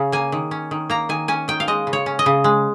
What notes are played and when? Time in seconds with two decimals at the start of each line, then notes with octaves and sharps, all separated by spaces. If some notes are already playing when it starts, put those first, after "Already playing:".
Already playing: C#3 C#4
0.12 A#3 G#5
0.32 D#3
0.51 C#4
0.71 D#3
0.90 A#3 A#5
1.09 D#3 G#5
1.28 C#4 G#5
1.48 D#3 G5
1.60 F5
1.68 G#3 D#5
1.87 C#3
1.93 C#5
2.06 C#4
2.19 D#5
2.26 C#3
2.44 G#3